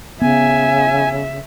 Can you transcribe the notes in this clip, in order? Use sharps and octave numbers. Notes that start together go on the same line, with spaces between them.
C#3 B3 E5 G#5